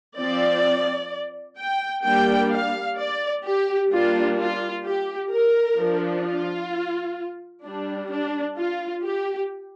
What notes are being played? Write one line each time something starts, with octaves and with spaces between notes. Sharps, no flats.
F3 C4 D5
G5
G3 A#3 D4 G5
F5
D5
G4
G3 A#3 D4 F4
F4
G4
A#4
F3 D4
F4
G3 D4
D4
F4
G4